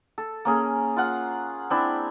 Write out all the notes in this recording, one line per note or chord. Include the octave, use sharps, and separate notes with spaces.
A4
A#3 C#4 G#4
F4 F#5
C4 D4 E4